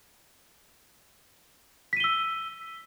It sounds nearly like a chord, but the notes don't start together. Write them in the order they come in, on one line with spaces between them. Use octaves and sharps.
B6 D#7 G7 E6